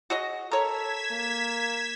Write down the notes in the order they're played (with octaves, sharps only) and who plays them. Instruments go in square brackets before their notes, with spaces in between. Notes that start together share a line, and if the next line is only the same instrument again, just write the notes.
[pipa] F#4 G#4 D#5
[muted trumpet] A4 [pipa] A#4 C#5 [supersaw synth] G#6 B6 E7
[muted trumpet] A#3